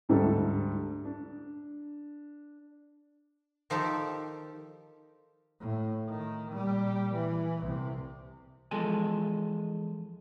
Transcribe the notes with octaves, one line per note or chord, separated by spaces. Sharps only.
D2 G#2 G3 A3 D4 A4
D4
D#3 F3 D#4 G4 A4
A2
D#3
A#2 G3
E3
C2 C3
E2 F3 G#3 A4 G#5